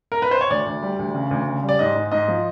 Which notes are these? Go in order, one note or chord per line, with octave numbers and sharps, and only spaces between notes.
A#4
B4
C5
C#5
D2 D5
D2
G3
D2
C#3
D2
C#3
G3
D5
G#2 D#5
G#2
G#2 D#5
F3